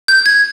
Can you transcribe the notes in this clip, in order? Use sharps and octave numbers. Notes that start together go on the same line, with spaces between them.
G6
G#6